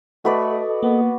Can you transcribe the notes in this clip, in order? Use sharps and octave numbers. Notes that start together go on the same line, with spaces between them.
A3 F#4 A4 B4 D5 D#5
A#3 B3